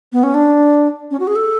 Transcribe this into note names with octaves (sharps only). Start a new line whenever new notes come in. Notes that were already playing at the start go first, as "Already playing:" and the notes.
B3
C#4
D4
C#4
F#4
G#4
A4